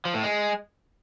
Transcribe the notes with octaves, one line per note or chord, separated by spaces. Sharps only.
F3
A2
G#3